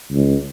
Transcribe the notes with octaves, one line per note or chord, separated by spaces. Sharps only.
C#2